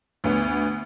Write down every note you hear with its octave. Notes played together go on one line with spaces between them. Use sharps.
D2 B3